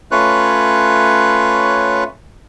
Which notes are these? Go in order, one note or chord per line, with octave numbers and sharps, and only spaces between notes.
A3 C#4 F4 B4 C#5 F#6